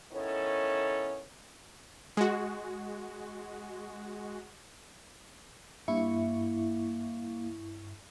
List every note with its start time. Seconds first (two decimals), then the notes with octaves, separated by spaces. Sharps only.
0.13 D#3 B3 C#4 E4 A4 C#5
2.17 G#3 F#4
5.88 G2 A#3 E4 C#6